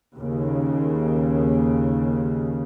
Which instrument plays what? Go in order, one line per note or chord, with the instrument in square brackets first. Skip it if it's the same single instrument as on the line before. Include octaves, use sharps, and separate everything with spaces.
[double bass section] D#2 C#3